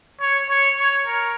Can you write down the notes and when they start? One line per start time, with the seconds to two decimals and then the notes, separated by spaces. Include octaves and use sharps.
0.20 C#5
0.49 C#5
0.78 C#5
1.06 A#4